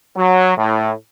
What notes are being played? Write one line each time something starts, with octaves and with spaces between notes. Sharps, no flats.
F#3
A2